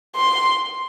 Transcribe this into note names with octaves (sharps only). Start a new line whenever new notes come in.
C6